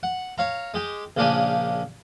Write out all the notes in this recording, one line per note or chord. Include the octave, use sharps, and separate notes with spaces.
F#5
C#5 F5 A#5
G#3 G4
A#1 C#3 A#3 D4 G4 G#5